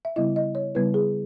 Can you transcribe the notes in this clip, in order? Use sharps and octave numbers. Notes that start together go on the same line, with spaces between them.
E5
C#3 G3 B3 E4 D#5
D#5
C#5
C#3 G3 B3 E4 B4
G#4